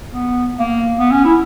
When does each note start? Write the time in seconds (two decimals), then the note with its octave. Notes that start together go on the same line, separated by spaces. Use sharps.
0.11 B3
0.59 A#3
0.99 B3
1.12 C#4
1.25 E4